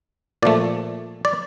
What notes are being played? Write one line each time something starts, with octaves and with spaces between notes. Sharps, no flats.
A#2 F3 A3 D5
D5